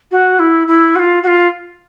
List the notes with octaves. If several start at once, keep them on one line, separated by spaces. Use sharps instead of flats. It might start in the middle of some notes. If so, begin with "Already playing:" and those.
F#4
E4
E4
F#4
F4
F#4
F4